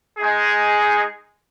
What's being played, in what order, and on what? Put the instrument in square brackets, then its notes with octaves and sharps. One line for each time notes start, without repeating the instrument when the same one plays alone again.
[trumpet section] G#3 D#4 G#4